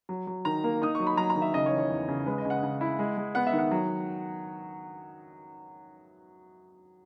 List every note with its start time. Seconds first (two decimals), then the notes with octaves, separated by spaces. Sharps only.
0.09 F#3
0.27 F#3
0.45 D#3 A#5
0.64 A#3
0.82 D#4 D#6
0.95 F#3 C#6
1.07 B5
1.17 F#3 A#5
1.30 A#5
1.36 D#3
1.42 E5
1.54 C#3 D#5
1.66 C#5
1.72 E3
1.78 C#5
1.90 E2
2.08 C#3
2.26 G#3 B4
2.38 D#5
2.45 C#3
2.50 F#5
2.63 C#3
2.81 E4
2.99 G#3
3.17 G#3
3.35 B3 F#5
3.47 E5
3.53 D#3
3.59 F#5
3.71 F#3